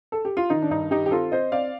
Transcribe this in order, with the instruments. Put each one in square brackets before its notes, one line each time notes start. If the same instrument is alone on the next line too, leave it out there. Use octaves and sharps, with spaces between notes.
[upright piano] A4
G4
F4
D#3 D#4
D4
G2 D#4
D#3 D#4 G4
G4
C4 F4 A4
C4 C5 D#5
C4 D5 F5